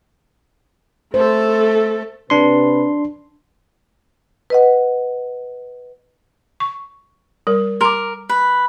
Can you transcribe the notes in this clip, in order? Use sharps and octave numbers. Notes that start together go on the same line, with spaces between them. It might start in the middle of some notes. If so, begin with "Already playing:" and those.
A3 A4 C5
C3 D4 B4 C6
B4 D#5 F#5
C#6
G3 A#4
A#4 C6 D6
B4